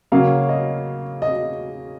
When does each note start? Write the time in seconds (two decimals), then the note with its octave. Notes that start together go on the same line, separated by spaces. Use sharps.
0.12 C#3 F#3 A#3 C#4 F5
0.49 D#5
1.22 D#5